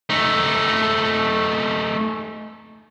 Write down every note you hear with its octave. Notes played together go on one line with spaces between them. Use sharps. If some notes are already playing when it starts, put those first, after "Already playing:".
A3 D#4